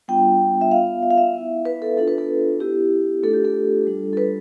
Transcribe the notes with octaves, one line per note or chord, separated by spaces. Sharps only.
G3 B3 D4 F4 G5
E5
B3 F4 F5
E5
F5
E5
B3 E4
B4
A4
B3 D4 F4 A4
B4
A4
B3 E4 G4
A3 D4 F4 A4
G4
A4
G3 D4 F4
A4
B4